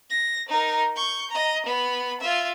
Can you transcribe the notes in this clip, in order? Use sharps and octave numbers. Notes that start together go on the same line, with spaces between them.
A#6
D#4 A#4
C#6 G6
D#5 A#5
B3 B5
F4 E5